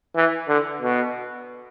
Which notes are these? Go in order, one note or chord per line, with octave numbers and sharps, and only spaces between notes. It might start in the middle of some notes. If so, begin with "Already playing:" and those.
E3
D3
B2